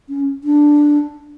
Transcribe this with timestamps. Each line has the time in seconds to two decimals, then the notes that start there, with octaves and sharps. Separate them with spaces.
0.09 C#4
0.44 D4